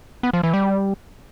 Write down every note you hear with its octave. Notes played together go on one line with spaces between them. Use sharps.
B3
F3
E3
G3